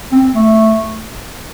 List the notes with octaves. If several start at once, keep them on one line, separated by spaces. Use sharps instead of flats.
C4
A3